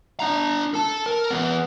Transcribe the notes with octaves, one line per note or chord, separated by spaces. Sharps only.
D4 A#5
A4 A5
A#4
B3 G#4